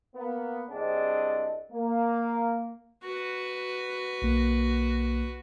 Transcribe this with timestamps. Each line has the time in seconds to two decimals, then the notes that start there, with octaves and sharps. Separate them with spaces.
0.15 A#3 B3
0.71 C2 C4 D4 G#4 D#5
1.71 A#3
3.04 F#4 B4
4.22 B1 A#3